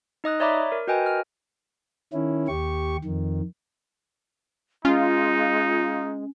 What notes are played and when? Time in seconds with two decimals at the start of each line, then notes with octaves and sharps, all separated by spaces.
0.24 D#4 D#5 D#6 F#6
0.40 C#5 D5 E5 A#5 B5 D6
0.72 A#4
0.87 F#4 A#4 B4 D#5 G5 G#5
1.06 F6
2.13 D#3 C#4 E4
2.48 D#2 G4 C#6
3.04 F2 D#3
4.85 G#3 C#4 D#4 F4